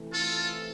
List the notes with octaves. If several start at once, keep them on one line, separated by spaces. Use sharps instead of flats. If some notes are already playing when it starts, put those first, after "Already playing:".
Already playing: C3 E3 A3
F4 A4